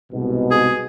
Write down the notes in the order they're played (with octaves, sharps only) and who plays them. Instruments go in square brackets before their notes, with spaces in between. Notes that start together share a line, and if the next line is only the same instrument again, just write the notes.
[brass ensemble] C2 G#2 B2
[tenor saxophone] G#4